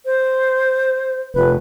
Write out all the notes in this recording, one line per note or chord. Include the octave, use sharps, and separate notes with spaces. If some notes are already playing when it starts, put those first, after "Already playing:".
C5
F1 B4